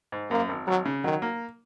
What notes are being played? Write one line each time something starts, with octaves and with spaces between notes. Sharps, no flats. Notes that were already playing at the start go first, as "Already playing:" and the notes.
G#2
F#2 A#3
G#1
G#1 F#3
C#3
D#3 F#3
A#3